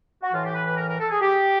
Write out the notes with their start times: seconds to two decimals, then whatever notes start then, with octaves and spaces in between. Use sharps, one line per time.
0.22 F#4
0.32 A2 E3 F4
0.44 G4
0.54 B4
0.66 B4
0.77 A#4
0.88 A#4
0.99 A4
1.10 G#4
1.21 G4